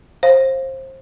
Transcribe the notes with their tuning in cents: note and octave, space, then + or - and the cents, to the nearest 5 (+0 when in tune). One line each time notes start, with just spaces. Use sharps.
C5 +25 F5 -10